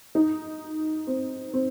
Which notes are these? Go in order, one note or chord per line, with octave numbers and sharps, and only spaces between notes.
D#4
C4
C4